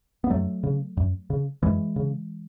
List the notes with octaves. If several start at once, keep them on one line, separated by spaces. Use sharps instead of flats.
B3
F#2 F#3 A3
C#3
F#2
C#3
F#2 E3 G#3
C#3